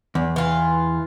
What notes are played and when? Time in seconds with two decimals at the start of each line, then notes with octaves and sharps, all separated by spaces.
0.15 E2
0.36 E3 F4